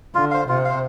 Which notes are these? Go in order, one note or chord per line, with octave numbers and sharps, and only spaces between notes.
D3 F4
C5 F5
C3 F4
C5 F5